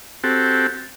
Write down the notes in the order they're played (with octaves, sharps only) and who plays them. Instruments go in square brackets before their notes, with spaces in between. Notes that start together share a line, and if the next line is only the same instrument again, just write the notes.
[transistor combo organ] C4 F#4 G4 A4